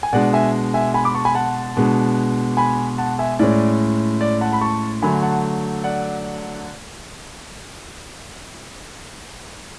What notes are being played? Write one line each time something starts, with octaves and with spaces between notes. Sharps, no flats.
G#5
B2 G#3 D4 D5 F#5
E5 G#5
E5 G#5
G#5 B5
B5 D6
A5 C#6
G#5 B5
F#5 A5
B2 G#3 D4
G#5 B5
F#5 A5
E5 G#5
A2 G#3 C#4 D5
D5
F#5 A5
B5
A5 C#6
D3 F#3 A3 G#5 B5
F#5 A5
D5 F#5